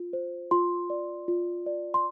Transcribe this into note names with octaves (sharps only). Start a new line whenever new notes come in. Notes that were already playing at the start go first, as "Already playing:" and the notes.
Already playing: F4
C5
F4 C6
D5
F4
D5
C6